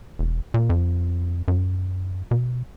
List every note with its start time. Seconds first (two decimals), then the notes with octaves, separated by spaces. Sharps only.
0.19 E1
0.54 A#2
0.70 F2
1.48 F#2
2.31 B2